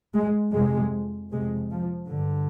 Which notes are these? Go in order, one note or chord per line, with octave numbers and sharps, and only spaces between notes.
G#3
F2 C3 G#3
F2 C3 G#3
F3
G2 D3